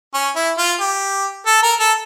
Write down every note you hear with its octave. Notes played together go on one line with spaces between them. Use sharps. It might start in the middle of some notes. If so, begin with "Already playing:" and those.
C#4
E4
F4
G4
A4
A#4
A4